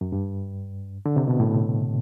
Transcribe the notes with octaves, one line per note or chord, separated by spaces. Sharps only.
F#2
G2
D3
C3
B2
A2